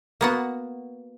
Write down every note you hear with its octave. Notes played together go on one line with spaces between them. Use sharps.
A#3 B3 F#4